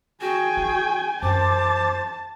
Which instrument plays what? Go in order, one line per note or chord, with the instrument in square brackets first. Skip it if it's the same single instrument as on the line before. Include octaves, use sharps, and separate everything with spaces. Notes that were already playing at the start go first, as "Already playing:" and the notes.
[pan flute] F#4 [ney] G#4 [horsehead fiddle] G5 G#5
[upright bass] E4
[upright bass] F#2 [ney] C5 [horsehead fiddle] A5 [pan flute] D6